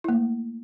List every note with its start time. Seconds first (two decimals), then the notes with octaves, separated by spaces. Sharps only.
0.04 E4
0.08 A#3
0.13 A3